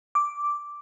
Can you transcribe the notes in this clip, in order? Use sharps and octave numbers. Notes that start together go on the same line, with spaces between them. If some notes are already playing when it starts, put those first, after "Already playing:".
D6